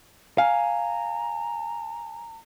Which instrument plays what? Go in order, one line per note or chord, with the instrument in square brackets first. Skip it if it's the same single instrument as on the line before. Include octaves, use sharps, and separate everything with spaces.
[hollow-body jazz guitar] F5 [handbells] G#5 [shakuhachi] A#5